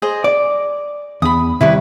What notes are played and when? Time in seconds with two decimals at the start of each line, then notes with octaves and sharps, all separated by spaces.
0.02 G#4 C5 D#5
0.24 D5 D6
1.22 E2 B5 D#6
1.61 C3 D#3 G3 E4 B4 C#6